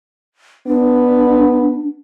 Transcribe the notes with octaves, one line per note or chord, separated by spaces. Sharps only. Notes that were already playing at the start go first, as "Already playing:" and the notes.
B3 D4